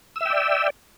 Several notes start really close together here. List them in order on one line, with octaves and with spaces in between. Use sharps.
E6 E5 G5 D5